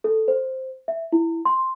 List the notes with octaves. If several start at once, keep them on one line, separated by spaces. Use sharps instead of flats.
A4
C5
E5
E4
C6